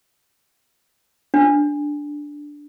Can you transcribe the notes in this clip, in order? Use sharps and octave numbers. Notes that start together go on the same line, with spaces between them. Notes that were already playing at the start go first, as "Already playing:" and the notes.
D4